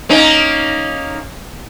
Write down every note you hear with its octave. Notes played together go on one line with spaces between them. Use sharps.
A#3 C#4 D#4